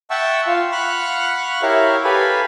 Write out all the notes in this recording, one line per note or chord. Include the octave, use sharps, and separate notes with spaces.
E5 F#5 G5 A5 C#6 E6
F4 F5
F5 F#5 B5 C#6 F6 F#6
E4 G4 A#4 C#5 E5 F5
G4 A4 B4 F5 G#5 B5